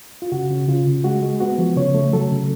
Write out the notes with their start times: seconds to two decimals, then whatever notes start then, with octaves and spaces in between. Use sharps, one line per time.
0.22 F4
0.32 C#3 F#4
0.51 C#3
0.68 C#3 F4
0.87 C#3
1.04 G#3 F#4
1.23 G#3
1.40 B3 F#4
1.58 F3
1.76 C#3 C#5
1.95 A3
2.13 F#3 A4
2.31 C#3